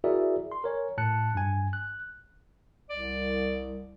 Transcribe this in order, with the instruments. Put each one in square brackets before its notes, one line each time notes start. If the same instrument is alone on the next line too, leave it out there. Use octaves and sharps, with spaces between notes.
[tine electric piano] E4 F#4 G#4 A#4 D5 E5
C6
A#4 C#5 G#5
A2 A5 F#6 C#7
G2 G#5
F#6
[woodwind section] C2 [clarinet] D5